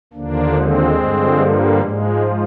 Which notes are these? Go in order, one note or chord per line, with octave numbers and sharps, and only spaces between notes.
D#2 D3 F3 A#3 D4
G#3 C4
G2 D3 F3
G3 A#3
G#2 F3 G#3